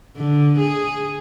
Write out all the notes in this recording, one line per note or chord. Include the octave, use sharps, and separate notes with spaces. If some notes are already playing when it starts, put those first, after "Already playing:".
D3
G#4